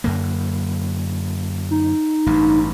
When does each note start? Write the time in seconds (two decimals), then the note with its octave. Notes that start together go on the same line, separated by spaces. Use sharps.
0.04 F#2 D3 A#3
1.71 D#4
2.27 A1 G2